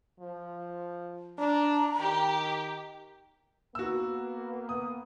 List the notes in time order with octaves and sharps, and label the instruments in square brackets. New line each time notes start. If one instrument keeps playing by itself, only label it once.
[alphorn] F3
[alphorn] D4 [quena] A#5
[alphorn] D#3 [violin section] G4
[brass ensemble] A#3 B3 [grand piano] F#4 E6
[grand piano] D#6